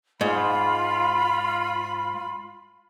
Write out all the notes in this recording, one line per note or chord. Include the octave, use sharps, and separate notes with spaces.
G#2 F4 B5